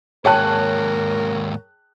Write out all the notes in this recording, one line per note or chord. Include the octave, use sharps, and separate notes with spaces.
D#2 G#2 G#4 A#4 C#5 G5 A5 F#6